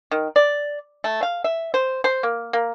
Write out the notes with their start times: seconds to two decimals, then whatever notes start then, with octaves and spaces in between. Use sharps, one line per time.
0.11 D#3
0.36 D5
1.04 A3
1.23 F5
1.44 E5
1.74 C5
2.04 C5
2.23 A#3
2.53 A#3